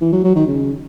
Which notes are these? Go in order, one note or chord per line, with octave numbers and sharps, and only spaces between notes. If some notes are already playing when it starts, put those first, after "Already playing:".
E3
F#3
F#3
D#3
C#3